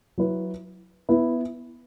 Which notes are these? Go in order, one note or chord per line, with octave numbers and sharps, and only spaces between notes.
F#3 E4 B4
B3 E4 B4